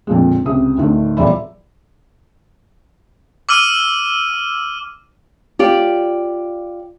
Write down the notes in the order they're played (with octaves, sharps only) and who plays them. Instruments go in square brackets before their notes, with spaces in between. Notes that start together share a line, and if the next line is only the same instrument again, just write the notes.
[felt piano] F2 A#2 D3 F3 G#3
C#2 C3 D#6
D2 A2 D3 D#3
D#1 E2 F4 D5 E5 B5
[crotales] D6 E6 F6 D#7
[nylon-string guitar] F4 G4 D5